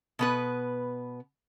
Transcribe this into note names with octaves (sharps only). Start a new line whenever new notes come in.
B2 B3 B4